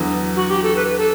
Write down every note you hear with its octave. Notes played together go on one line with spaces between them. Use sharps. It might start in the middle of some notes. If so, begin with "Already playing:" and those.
Already playing: E2 D3 F#3 B3
F#4
G4
A4
B4
A4